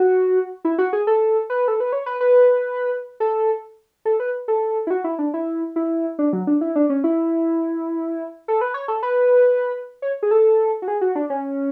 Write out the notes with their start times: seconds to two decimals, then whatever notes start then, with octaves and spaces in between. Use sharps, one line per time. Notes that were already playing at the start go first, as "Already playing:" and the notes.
Already playing: F#4
0.65 E4
0.78 F#4
0.93 G#4
1.07 A4
1.50 B4
1.68 A4
1.80 B4
1.93 C#5
2.06 B4
2.21 B4
3.20 A4
4.05 A4
4.20 B4
4.48 A4
4.87 E4
4.90 F#4
5.04 E4
5.19 D4
5.34 E4
5.76 E4
6.19 D4
6.33 F#3
6.47 D4
6.61 E4
6.75 D4
6.89 C#4
7.04 E4
8.48 A4
8.61 B4
8.74 C#5
8.88 A4
9.03 B4
10.02 C#5
10.23 G#4
10.31 A4
10.82 F#4
10.88 G#4
11.01 F#4
11.15 D4
11.30 C#4